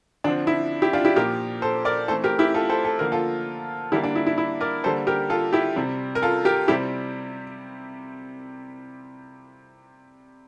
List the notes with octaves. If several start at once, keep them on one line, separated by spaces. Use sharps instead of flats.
D3 F3 C4 D4
E4
E4 G4
D4 F4
E4 G4
A#2 F3 A#3 G4 A#4
A4 C5
A#4 D5
E3 A3 C4 A4 C5
G4 A#4
E4 G4
F4 A4
A4 C5
A4
D3 F3 A#3 A#4
F4 A4
D3 G3 A#3 E4 G4
D4
E4
E4
E4
A#4 D5
D3 G3 A#3 A4 C5
G4 A#4
F4 A4
E4 G4
C3 G3 C4
A#4
F4 A4
G4 A#4
C3 G3 C4 E4 G4